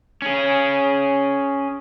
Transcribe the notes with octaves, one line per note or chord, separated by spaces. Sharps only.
C#4 G#4